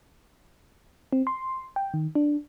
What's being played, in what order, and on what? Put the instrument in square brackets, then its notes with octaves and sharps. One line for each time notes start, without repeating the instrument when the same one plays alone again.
[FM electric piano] C4
C6
G5
D#3
D4